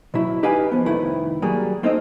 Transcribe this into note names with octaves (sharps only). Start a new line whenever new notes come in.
B2 F#3 E4
D#4 G4 B4 D#5 F5 G#5
F3 B3
C2 F2 D#3 A3 E4 B4
F#3 G3 A#3 G#4
A#3 C4 D#4 A4 C#5 D#5